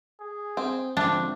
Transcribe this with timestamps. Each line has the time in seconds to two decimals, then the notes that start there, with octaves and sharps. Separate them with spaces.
0.21 G#4
0.57 C4
0.97 F2 G#2 D3 A3 C4 D4